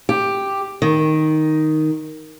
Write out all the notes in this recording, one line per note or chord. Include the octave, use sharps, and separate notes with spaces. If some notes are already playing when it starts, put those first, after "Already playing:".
G4
D#3